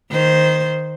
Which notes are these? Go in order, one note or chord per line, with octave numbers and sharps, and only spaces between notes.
D#3 C5